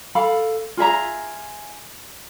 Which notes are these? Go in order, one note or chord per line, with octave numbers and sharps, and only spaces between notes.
A4 F5 B5
F4 G#4 E5 A#5